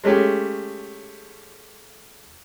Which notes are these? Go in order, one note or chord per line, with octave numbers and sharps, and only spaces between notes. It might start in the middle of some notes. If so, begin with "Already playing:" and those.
G#3 A3 C#4 G4